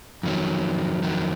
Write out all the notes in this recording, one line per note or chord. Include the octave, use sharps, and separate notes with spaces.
F2 D#3 F#3
F2 D#3 F#3